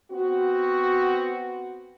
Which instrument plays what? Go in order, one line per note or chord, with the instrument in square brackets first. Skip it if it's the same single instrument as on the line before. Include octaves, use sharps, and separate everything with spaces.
[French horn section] B3 C4 F#4